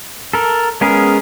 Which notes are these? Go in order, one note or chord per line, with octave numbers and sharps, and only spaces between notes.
A4 A#4
G#3 B3 C#4 G#4 A#4